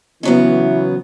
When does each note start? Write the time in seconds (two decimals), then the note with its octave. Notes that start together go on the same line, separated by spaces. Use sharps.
0.23 C#3 E3 F#3 B3